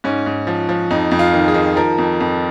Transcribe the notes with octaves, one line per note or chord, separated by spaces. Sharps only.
G#2 C#4
G#2
F3
F3
F2 D#4
F2
F4
D#3
G#4
D#3
F3 A#4
F2
F2